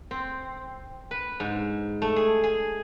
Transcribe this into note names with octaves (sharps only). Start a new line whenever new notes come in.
C4
B4
G#2
A3
G#4
G#4